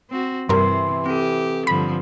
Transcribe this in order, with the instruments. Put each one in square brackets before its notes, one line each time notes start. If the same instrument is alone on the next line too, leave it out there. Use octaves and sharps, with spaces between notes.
[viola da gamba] C4 F#4
[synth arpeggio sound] G2 A#4 [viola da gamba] C3 [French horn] E3 [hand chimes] C6
[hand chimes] C4 A4 [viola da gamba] G4
[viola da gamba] G2 D3 F3 [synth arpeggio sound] B5